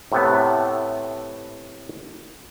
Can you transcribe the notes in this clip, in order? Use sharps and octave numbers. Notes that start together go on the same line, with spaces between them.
A2 C3 A3 B3